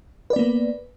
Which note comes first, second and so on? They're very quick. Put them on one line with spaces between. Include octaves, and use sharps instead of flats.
B4 D5 B3 A#3